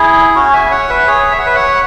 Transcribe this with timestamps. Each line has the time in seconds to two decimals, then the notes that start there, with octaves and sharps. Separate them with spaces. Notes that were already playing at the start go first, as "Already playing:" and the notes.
Already playing: E4 G#4
0.35 C#4 F#4
0.53 E5 G#5
0.71 C#5 F#5
0.90 B4 E5
1.07 G#4 C#5
1.32 E5
1.39 F#5
1.46 B4 E5
1.55 C#5 F#5